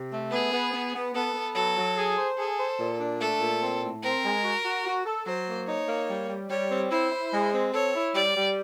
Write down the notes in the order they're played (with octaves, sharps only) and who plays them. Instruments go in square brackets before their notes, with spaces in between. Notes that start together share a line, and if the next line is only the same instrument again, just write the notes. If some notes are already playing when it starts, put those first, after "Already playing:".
Already playing: [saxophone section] C3
A3
[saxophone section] B3 [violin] G#4
[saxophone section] B3
B3
B3
[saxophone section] B3 [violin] A4
[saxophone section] B3
[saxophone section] F#3 [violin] A4
[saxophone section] F#3
G#4
C5
[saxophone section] G#4 [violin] A4
[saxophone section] C5
A#2
D4
[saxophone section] A3 [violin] A4
[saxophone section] A#2
C4
A2
[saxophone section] C4 [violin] A#4
[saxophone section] G#3
F#4
F#4
F#4
A4
[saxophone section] F#3 [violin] C5
[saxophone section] A#3
[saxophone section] D#4 [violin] C#5
[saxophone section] A#3
G3
G3
[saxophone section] G3 [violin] C#5
[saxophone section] C4
[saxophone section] E4 [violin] C5
[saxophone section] E4
G#3
C4
[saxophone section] A4 [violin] C#5
[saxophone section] E4
[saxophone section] G3 [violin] D5
[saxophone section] G3